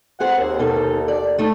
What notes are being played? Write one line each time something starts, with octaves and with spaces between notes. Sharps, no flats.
C4 G#4 C5 F#5
D#2
B2 D#4 A4
D5
A3 D#4